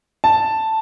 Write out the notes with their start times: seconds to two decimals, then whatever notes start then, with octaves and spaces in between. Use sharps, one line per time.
0.24 A5